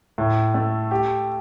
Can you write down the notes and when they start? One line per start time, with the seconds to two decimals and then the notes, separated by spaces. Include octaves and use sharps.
0.18 A2
0.54 A3
0.91 G4